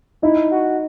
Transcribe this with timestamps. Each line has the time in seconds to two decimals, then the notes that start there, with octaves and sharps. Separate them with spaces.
0.22 D#4 E4
0.51 F#4